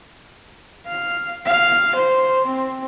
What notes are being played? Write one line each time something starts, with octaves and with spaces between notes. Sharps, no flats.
F5
F5
C5
C4